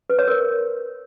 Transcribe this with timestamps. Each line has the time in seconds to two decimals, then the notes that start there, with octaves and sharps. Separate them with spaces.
0.10 B4
0.19 C#5
0.28 A#4